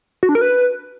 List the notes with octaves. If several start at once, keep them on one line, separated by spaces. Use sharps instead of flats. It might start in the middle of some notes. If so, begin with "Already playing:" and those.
F#4
D4
A#4
B4